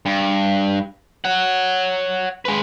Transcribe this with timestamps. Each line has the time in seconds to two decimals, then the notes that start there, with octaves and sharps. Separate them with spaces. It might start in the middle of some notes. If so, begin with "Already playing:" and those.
0.06 G2
1.25 C#5 F#5
2.45 G#3 B4